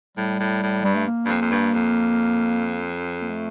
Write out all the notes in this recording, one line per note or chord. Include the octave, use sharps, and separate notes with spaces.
A2 G3
A2
A2
G2 G3
A3
A#3
G2
F2
F2
G2
F2
A#3
A3